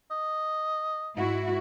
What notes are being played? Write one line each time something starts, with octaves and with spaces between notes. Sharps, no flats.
D#5
G#2 E4 F#4